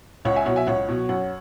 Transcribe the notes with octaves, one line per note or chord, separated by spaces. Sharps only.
C#2 C#5 F#5
E5 G#5
B2 F#3 C#5 F#5
E5 G#5
C#2 C#5 F#5
B2 F#3
F#2 C#5 F#5